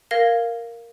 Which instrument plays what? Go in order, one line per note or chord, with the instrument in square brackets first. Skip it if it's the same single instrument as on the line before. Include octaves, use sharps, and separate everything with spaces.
[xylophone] A#4 F5 G#6 A#6 G7